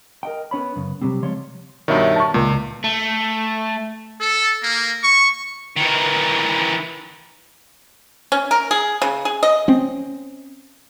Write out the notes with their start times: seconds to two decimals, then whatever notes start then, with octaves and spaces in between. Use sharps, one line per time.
0.23 A#4 D#5 G5
0.51 B3 C#4 C#5 B5
0.76 F#2 C#3
1.01 C3 D#3 F#3 G3 C4
1.22 C#3 F3 G#3 C#5 D5 C6
1.88 G2 B2 D#3 C#5 E5
2.16 A5 C#6
2.34 C#2 A#2
2.84 A3
4.21 A4
4.63 A#3
5.04 C#6
5.77 D#3 E3
8.32 C#4
8.51 A#4
8.71 G#4
9.02 C#3
9.25 G#4
9.43 D#5
9.68 C4 C#4